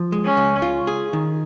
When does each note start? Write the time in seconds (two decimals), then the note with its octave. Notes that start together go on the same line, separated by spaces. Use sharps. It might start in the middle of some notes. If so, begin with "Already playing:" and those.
Already playing: F3
0.12 G#3
0.25 C#4
0.37 C#2
0.62 F4
0.87 G#4
1.13 D#3